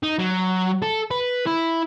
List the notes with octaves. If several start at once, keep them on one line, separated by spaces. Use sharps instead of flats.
D#4
F#3
A4
B4
E4